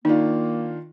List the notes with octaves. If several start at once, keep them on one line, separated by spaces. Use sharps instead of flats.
D#3 A#3 D4 D#4 F4